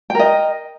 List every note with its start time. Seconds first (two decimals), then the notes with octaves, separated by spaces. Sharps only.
0.10 G5
0.15 A#4
0.19 D#5